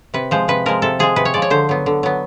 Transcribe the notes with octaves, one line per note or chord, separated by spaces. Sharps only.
C3 B4
F3 G#3 C5
C3 B4
F3 G#3 A#4
C3 A4
F3 G#3 G#4
C3 B4
C#5
F3 G#3 D5
C#5
D3 C5
F#3 B3
D3
F#3 B3